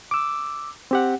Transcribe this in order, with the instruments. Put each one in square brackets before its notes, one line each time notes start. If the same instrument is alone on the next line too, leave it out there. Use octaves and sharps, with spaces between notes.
[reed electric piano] D6 E6
C4 G4 F#5